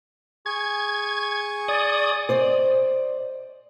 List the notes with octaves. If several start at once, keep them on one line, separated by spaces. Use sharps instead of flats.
G#4 C#6 G#6
D5 D#6
C5 D5 D#5